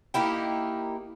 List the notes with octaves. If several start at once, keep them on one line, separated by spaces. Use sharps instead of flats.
A#3 D#4 E4 G4